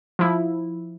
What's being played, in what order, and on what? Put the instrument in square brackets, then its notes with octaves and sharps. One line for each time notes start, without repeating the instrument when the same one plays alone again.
[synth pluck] F3 E4